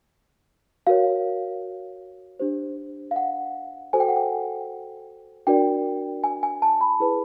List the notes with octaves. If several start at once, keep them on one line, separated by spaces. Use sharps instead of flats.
F#4 A#4 C#5 F5
D4 G4 C5
F5
F#5
F#4 A4 C5 G#5
G5
F#5
G5
D4 F#4 A#4 D5 G5
G#5
G#5
A5
B5
E4 G#4 B4